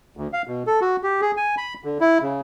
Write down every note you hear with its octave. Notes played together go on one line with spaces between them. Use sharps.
D2
F5
B2
A4
F#4
G4
G#4
G#5
B5
D3
E4
C#3